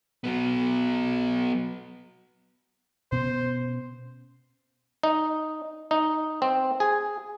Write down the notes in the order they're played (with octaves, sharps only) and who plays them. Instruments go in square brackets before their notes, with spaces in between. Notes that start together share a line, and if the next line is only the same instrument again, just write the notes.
[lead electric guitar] F#3 B3
[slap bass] B2 B3 C#4 [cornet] C5
[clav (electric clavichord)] D#4
D#4
C4
G#4